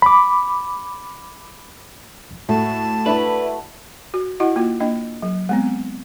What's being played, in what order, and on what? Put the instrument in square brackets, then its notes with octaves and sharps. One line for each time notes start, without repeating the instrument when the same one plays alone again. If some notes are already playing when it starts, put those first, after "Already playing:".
[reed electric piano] B5 D6
[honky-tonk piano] A2 [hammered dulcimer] A3 F#4 [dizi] A5
[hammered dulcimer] A3 [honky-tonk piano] D4 E4 [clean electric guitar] B4
[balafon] F#4
E4 F#4 D#5 F#5
A#3 F4
A#3 D4 D#5
F#3
G#3 B3 C4